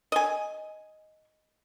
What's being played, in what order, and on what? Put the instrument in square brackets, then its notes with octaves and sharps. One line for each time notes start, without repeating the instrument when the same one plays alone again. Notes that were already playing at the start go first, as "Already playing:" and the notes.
[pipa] D#5 G#5